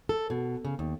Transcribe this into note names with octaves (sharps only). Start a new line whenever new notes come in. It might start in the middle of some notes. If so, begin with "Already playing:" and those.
A4
B2
C#3
D#2